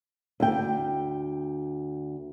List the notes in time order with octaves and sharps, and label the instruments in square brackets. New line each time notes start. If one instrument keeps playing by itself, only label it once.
[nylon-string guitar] D2 G5